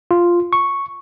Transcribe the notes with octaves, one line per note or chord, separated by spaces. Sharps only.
F4
C#6